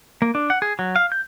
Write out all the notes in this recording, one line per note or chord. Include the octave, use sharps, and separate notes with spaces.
A#3
D4
F#5
G#4
F#3
F5
G6